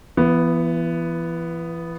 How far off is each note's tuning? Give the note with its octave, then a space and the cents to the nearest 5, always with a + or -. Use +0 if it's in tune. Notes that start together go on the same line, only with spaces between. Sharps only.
E3 +35 B3 +0